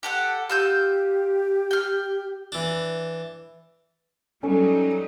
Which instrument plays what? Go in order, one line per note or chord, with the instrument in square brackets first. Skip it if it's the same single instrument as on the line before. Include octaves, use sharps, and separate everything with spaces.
[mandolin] G4 A4 F#5
[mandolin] F4 E6 G6 [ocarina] G4
[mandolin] G5 F6
[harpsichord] E3 D4
[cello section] F#3 G3 D#4 [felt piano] C#4 A4